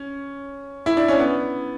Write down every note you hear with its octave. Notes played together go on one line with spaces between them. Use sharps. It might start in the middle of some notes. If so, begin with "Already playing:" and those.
Already playing: C#4
E4
D4
C#4
B3